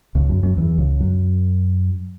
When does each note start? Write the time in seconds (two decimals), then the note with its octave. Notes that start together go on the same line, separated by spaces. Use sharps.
0.15 C#2 C#3
0.29 F#2 F#3
0.43 F#2 F#3
0.57 E2 E3
0.78 C#2 C#3
1.00 F#2 F#3